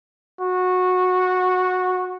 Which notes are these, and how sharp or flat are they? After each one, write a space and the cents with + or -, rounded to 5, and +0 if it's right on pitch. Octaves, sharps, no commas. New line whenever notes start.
F#4 -15